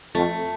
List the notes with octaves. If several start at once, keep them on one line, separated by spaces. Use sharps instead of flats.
F2 A3